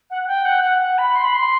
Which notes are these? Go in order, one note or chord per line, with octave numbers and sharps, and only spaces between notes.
F#5
F#5
G5
F#5
F#5
F#5
B5
C6
B5
C6